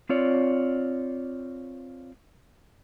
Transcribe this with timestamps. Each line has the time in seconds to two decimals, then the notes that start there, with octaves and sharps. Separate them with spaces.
0.09 C4 F4 C#5 D5